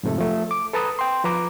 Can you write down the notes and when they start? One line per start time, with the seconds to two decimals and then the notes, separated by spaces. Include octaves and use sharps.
0.03 F2 G#2 C3 A3 A4
0.18 F3 A3
0.51 D6
0.73 A4 B4 A5 A#5 D#6
0.99 G5 C6
1.24 F3 B4 A#5 D6